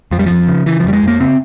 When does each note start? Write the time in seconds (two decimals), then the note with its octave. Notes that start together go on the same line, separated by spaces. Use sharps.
0.11 F2 F3
0.19 G3
0.26 F2 F3
0.48 C#3
0.66 C#3 E3
0.80 F3
0.84 F2 G3
0.93 G#3
1.03 F2 A#3
1.20 C#3 C4